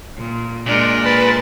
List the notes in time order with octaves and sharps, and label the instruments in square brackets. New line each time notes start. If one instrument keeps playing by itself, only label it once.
[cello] A#2
[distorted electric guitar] A#2 [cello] G#3 A#4 [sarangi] D4
[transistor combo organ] B4 [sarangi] A5